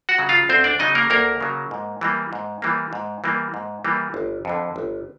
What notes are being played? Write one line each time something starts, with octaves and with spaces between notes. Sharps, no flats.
F#4 F#5
C#3 F#3
F4 F5
D2 C4 C5
D4 D5
C#3 F#3 D#4 D#5
A#3 A#4
D2 A#3 A#4
C#3 F#3
G#2
E3 G3 A#3
G#2
E3 G3 A#3
G#2
E3 G3 A#3
G#2
E3 G3 A#3
G1
F2 D3
G1